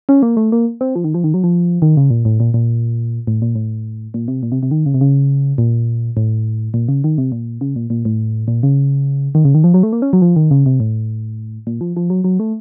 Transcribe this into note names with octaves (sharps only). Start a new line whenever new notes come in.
C#4
A#3
A3
A#3
C4
F3
D#3
F3
D#3
F#3
F3
D#3
C#3
A#2
A2
A#2
A#2
A2
A#2
A2
A#2
C3
A#2
C3
C3
D#3
C#3
C3
C#3
A#2
A2
A#2
C#3
D#3
C3
A#2
C#3
A#2
A#2
A2
A#2
C#3
D#3
C#3
D#3
F3
F#3
A3
A#3
C#4
F#3
F3
D#3
C#3
C3
A2
A#2
F3
F3
F#3
F#3
A3